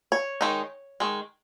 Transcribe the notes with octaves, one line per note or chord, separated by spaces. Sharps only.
C#5
D#3 G#3 D#4
D#3 G#3